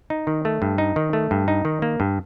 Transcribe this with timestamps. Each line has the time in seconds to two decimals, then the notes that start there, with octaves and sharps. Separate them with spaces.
0.10 D#4
0.27 D#3
0.45 A3
0.62 G2
0.78 D#4
0.96 D#3
1.13 A3
1.31 G2
1.48 D#4
1.65 D#3
1.82 A#3
2.00 G2